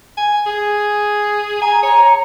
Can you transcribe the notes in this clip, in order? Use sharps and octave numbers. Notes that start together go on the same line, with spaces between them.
G#5
G#4
G#5 A#5
C#5 A#5